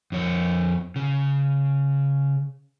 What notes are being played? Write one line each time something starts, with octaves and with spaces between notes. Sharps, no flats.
F2 C#5
C#3